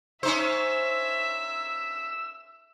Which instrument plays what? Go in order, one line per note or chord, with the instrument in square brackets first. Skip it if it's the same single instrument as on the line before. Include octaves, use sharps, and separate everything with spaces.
[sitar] C#4 D#4 C5 [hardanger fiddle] E5 [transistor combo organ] E6